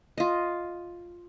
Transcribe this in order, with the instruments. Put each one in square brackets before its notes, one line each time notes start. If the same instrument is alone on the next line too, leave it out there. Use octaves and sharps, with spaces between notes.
[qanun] F4 D#5